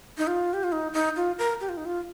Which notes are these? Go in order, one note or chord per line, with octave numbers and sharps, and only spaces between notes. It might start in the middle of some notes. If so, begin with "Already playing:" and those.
D#4
F4
G4
F4
D#4
D#4
F4
A#4
G4
F4
D#4
F4